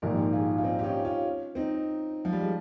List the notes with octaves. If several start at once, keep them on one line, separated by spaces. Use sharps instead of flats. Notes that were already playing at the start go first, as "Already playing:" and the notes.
A#1 G#2 D#3 G4 A#4
F4 G#4
F4
C4 D#4
G4
C#4 F4
C#4 F4
C4 D#4
F3
G3
G#3